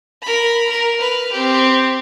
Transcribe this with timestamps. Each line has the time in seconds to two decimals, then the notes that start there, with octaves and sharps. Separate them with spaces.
0.22 A#4 B5
0.70 A#4
0.98 B4 F6
1.32 C4 G4